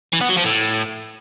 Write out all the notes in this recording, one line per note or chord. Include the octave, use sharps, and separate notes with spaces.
E3
B3
F#3
F3
A2